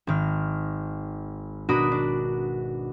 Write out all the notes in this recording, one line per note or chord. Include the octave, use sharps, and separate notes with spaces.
G#1 D#3 F6
B2 D4 F#4 A#4 B5 D#6
D4